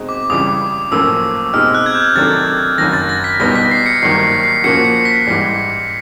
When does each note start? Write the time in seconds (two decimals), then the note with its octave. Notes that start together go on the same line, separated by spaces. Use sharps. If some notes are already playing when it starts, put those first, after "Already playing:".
Already playing: B2 G#3 C4 D#4
0.09 D6
0.30 C#2 C#3 E3 G3 D#6
0.92 B1 A2 F3 A#3 C#4 E6
1.53 B2 G#3 C4 D#4 G4 F6
1.74 F#6
1.86 G#6
1.95 G6
2.15 C3 D#3 F#3 A3 D4 A6
2.78 F#1 F#2 D#3 A#6
2.93 A6
3.09 A#6
3.24 B6
3.40 C#2 B2 G3 B3 D#4 A#6
3.56 B6
3.71 C7
3.86 C#7
4.02 G#1 G2 D#3 F#3 A#3 C7
4.23 C7
4.43 C7
4.64 A#2 F3 A#3 C#4 F#4 C#7
4.85 C#7
5.05 B6
5.27 G#2 E3 G3